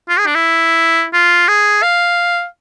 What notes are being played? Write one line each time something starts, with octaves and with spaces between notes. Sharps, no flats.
F4
G#4
D4
E4
F4
G#4
F5